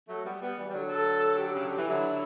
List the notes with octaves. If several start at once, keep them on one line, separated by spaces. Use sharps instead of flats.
F#3 A3
G3 B3
G3 B3
E3 G3
G3
D3 F#3
A4
G4
C#3
D3
E3
D3 F#3 E4